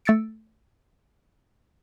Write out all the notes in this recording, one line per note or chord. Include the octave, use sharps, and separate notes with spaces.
A3 E6 A6 C#7 D7